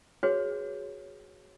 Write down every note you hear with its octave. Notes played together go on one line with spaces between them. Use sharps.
F#4 G#4 B4 C#5